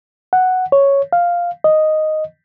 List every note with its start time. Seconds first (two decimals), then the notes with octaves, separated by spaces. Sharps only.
0.33 F#5
0.72 C#5
1.13 F5
1.64 D#5